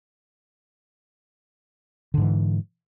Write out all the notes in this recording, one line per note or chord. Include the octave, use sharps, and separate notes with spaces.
G#2 D3 E3